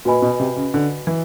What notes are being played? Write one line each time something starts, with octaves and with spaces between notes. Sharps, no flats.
A#2 F#4 B4 D#5 G#5 B5
B2
C3
C#3
D3
E3